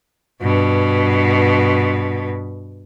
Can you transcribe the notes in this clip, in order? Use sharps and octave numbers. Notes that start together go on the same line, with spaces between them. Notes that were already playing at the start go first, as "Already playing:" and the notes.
G2 B2